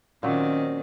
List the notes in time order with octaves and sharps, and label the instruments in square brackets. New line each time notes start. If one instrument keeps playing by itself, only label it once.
[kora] A#2 F#3 [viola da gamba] D#3 C4 [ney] C#4